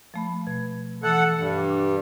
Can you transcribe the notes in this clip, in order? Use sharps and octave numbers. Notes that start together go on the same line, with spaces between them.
F3 A3 B5
B2 G#6
E3 A4 F#5
G2
D4